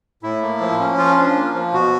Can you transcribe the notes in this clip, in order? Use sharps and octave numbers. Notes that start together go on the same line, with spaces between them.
A2 E4
A#3
F3
C#4
F3 F4
D4
A#3
F3
B2 F#4